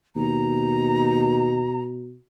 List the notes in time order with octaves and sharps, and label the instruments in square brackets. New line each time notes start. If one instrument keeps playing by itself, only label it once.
[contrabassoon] D#2 [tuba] B2 [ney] A#5